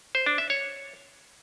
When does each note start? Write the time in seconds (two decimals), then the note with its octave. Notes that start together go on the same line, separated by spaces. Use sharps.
0.15 C5
0.26 D4
0.38 E5
0.50 C#5